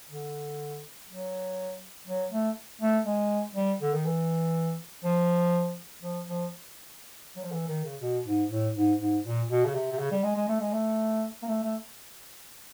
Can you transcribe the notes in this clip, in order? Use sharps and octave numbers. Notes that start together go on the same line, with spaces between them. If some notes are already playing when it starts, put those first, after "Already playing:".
D3
F#3
F#3
A3
A3
G#3
G3
D3
D#3
E3
F3
F3
F3
F#3
F3
E3
D#3
C#3
B2
G#2
A2
G#2
G#2
A#2
B2
C#3
C3
C3
C#3
G3
G#3
G#3
A3
G#3
A3
A#3
A3
A3